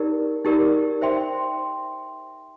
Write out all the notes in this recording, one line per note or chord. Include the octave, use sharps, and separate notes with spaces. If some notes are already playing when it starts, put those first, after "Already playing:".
Already playing: D#4 G4 A#4 D5
D#4 G4 A#4 D5
C5 E5 G5 C6